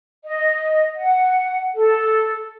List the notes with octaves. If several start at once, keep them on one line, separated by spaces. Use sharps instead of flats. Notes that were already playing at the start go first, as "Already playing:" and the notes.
D#5
F#5
A4